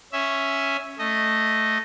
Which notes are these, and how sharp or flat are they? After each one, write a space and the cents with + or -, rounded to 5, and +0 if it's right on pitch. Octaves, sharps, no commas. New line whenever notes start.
C#4 +0 E5 +0
A3 +0 D#5 -5